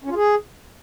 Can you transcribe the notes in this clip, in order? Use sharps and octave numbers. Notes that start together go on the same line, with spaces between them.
C#4
F4
G#4